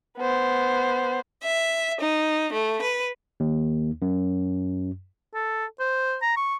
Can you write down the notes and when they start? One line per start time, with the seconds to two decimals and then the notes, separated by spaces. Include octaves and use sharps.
0.18 B3 C5
1.43 E5
2.01 D#4
2.53 A3
2.81 B4
3.40 D#2
4.02 F#2
5.34 A4
5.80 C5
6.22 A#5
6.36 C#6